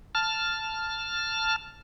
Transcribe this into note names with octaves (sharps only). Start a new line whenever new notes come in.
A5 F6